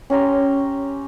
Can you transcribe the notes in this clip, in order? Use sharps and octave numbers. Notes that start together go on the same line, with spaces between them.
C#4 G4 A#5 C6